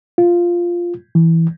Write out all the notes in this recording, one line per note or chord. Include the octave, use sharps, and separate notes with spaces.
F4
E3